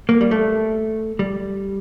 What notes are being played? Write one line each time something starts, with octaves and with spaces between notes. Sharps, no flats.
A#3
G3
A3
G3